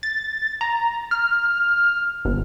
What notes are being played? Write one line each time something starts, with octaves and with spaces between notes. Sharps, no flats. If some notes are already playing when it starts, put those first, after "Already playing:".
A6
A#5
F6
G1